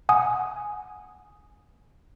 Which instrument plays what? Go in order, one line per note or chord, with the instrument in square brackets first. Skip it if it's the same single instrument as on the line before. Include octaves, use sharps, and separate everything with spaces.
[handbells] F#5 G#5 D#6